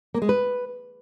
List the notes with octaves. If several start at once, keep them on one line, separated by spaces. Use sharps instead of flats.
A#3
G#3
B4